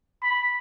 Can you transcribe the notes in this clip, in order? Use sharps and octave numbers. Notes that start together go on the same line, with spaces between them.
B5